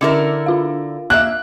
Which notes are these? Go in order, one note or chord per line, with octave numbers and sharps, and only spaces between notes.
D3 C#4 E4 A#4 D6 C#7
D4 F4 F5
A#3 E5 F#6